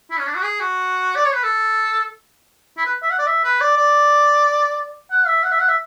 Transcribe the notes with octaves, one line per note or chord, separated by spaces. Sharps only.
E4
C#4
D4
F#4
G#4
F#4
D5
C#5
B4
A4
E4
B4
E5
F#5
D5
E5
B4
D5
D5
F#5
E5
F#5
E5
F#5
E5